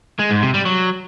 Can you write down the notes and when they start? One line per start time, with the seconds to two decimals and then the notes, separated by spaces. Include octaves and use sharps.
0.19 G#3
0.31 G#2
0.42 C3
0.54 G3
0.65 F#3